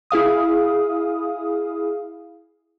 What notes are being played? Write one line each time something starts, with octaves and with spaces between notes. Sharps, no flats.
E4 G#4 F5 D#6